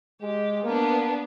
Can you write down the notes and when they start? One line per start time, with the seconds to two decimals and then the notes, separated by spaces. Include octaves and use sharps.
0.22 G#3 G4
0.64 A#3 B3 D4